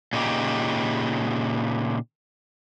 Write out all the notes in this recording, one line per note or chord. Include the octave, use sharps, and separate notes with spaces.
A#2 C#3 D#4 G4